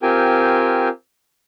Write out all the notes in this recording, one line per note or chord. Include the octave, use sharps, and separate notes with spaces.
C4 F4 G4 A#4 G5 G#5